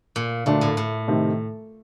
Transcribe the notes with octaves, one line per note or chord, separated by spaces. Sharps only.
A#2
D2 A#2 D3 A3 D4
A2
A2
C3 D#3 A3